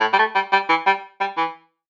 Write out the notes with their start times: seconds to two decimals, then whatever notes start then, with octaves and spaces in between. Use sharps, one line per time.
0.01 A2
0.13 G3
0.19 A3
0.35 G3
0.53 G3
0.69 E3
0.86 G3
1.20 G3
1.37 E3